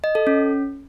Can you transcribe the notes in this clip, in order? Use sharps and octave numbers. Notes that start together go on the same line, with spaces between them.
D#5
A4
C#4